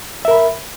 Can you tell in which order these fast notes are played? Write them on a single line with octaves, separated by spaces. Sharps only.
E5 A#4 B5